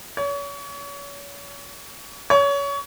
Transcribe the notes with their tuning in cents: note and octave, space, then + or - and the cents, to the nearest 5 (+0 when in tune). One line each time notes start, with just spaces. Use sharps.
C#5 +35
C#5 +25